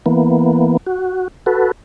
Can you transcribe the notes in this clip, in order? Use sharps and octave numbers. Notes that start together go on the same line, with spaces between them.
E3 A#3 B3
F#4
F#4 A4 B4